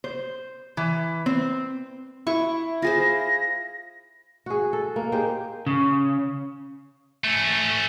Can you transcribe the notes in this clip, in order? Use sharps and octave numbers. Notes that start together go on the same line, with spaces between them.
C5
E3
C4
E4 C#6
F4 G#4 C5 A#6
F#4 G#4
A4
A#3
D#4 G4 G#4 C5
C#3
A3 C#4